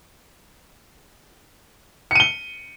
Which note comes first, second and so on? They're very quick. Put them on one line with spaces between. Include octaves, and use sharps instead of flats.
C#7 D#7 G7